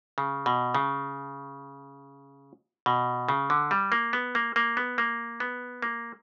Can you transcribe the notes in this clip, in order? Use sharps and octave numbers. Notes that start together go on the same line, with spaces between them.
C#3
B2
C#3
B2
C#3
D3
G3
A#3
B3
A#3
A#3
B3
A#3
B3
A#3